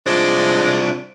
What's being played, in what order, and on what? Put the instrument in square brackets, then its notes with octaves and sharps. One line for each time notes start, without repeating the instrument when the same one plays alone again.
[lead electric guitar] C2 D4 [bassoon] F3 [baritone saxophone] G#3